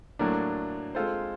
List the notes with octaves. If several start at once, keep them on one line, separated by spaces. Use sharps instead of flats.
A2 F#3 A#3 D4
G#3 C4 F4 A4 C5